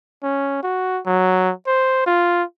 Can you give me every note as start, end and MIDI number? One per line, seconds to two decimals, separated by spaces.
0.23 0.60 61
0.63 1.00 66
1.06 1.52 54
1.67 2.02 72
2.06 2.43 65